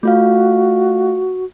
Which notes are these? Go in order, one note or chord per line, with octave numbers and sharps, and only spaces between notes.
A3 F4 F#4 F5